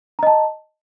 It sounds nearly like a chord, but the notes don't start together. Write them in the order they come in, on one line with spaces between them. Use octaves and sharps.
A#5 D#5 A5